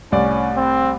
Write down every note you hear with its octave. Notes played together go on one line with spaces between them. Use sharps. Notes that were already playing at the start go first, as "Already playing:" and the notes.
C2 A2 C#4 D5
C4